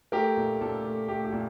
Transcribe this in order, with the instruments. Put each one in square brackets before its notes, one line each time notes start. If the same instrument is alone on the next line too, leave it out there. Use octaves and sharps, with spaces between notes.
[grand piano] A3 G4 A#4
A#2
A#2 A4
A3
A3 G4
G4
A#2